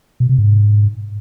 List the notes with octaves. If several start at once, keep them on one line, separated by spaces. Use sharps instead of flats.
B2
C3
G#2